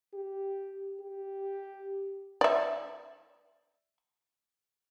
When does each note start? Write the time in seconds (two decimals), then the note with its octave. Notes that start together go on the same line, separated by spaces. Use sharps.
0.14 G4
1.01 G4
2.41 D5 E5